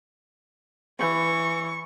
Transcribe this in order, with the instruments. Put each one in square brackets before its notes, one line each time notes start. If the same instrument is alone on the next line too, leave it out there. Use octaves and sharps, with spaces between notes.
[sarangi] E3 [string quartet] C#6